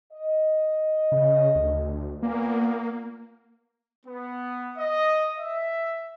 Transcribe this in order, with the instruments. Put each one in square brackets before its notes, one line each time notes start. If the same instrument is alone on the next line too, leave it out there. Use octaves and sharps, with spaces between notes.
[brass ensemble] D#5
[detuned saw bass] C#3
D2
[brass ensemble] A#2 B3 [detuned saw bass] A#3
[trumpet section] B3
D#5
E5